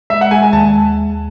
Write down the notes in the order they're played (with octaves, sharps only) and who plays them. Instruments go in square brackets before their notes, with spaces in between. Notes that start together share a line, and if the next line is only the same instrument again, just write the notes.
[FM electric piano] G#3 [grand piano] E5
[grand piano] F#5
[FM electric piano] G#3 [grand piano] G#5
[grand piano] G#5
[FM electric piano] D#2 [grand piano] A5